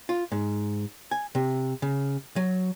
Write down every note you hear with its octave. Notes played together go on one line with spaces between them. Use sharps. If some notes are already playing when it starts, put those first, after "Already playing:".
F4
G#2
G#5
C3
C#3
F#3